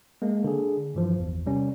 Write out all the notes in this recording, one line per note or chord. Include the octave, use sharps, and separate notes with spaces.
G#3 A#3
D3 G#4
G2 E3 F3
G#1 E2
C3 G3 C#4